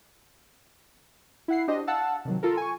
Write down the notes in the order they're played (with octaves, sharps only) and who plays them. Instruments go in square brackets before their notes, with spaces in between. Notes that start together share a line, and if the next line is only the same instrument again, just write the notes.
[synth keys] E4 F#5 C7
D4 F#4 G4 C5 D#5
F5 F#5 A5 E6
C3 D#3 F#3
F4 A4 A#4
G#5 C#6